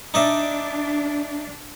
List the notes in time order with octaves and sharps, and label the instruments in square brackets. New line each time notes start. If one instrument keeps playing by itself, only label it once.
[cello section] D4 [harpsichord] D#4 D5 E5